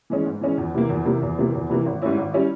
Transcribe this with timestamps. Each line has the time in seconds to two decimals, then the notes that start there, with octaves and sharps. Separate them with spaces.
0.10 E3 G#3 C#4
0.26 G#2
0.41 E3 G#3 C#4
0.58 E2
0.74 C3 E3 A#3
0.89 E2
1.05 C3 E3 A#3
1.22 E2
1.38 C3 E3 A#3
1.54 E2
1.70 C3 E3 A#3
1.86 G#1
2.02 G#2 G3 C#4 E4
2.17 G#1
2.33 G3 C#4 E4